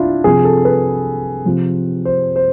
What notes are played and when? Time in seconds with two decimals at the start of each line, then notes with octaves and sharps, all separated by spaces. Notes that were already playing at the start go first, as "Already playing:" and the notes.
Already playing: C3 D4 E4 F4
0.24 C3 F3 G#4
0.44 A4
0.65 B4
1.45 C3 F3
2.05 C5
2.36 C5